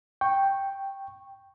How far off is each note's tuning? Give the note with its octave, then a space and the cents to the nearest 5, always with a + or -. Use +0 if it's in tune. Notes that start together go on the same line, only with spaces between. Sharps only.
G5 +0 C#6 -10